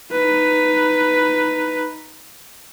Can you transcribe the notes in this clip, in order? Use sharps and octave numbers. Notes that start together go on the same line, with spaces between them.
D#4 B4